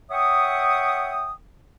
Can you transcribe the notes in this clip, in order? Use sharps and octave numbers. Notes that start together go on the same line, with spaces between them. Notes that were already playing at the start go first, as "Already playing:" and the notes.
C#5 E5 F#5 G5 C#6 D#6